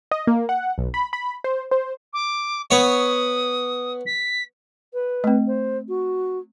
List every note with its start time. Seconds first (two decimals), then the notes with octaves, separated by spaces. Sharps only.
0.11 D#5
0.27 A#3
0.49 F#5
0.78 B1
0.94 B5
1.13 B5
1.44 C5
1.71 C5
2.13 D6
2.71 B3 C#5 D#6
4.06 B6
4.94 B4
5.24 A3 C4
5.47 C5
5.89 F#4